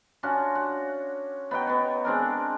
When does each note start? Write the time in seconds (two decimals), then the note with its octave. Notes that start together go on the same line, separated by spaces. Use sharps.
0.23 C#4 D4 F4 F#4
0.55 F#4
1.51 B3 D#4 F#4 G5
1.67 B3 C#5
2.05 G#3 C4 D4 A#4